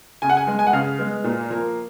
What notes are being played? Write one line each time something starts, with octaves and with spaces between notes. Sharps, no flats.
C#3 G#5
F#5
G#5
G#3 B3
G#5
F#5
C#3 F5
G#3 B3
A#2
F3 A#3